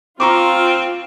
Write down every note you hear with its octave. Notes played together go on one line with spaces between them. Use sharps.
C4 F4 A#5 C#6 D6